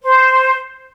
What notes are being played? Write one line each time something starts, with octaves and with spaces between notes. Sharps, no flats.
C5